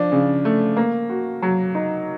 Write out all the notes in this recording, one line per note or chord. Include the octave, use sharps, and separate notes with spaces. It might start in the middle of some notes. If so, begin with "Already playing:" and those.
Already playing: F3 D4
C#3
A3
A#3
F#4
F#3
D#4